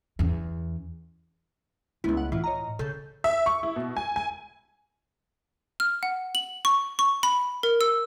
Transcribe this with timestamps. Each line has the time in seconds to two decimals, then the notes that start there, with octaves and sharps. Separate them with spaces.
0.19 E2 C#4
2.04 C#2 A3 B3 E4
2.17 F#5
2.32 A2 E3 E4 F4
2.44 C#5 D#5 A#5
2.79 C#3 A4 G6
3.24 E5
3.46 C#6
3.63 E4
3.76 B2
3.97 G#5
4.16 G#5
5.80 F6
6.03 F#5
6.35 F#7
6.65 C#6
6.99 C#6
7.23 B5
7.63 A#4
7.81 E6